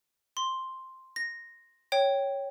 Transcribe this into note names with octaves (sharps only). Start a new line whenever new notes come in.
C6
A#6
C#5 G5